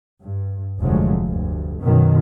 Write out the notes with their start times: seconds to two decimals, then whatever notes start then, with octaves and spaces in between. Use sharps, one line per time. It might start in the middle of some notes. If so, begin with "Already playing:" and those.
0.23 G2
0.80 F1 D2 F3 F#3 G#3
1.25 D2 G2
1.82 F#2 B2 D#3 F#3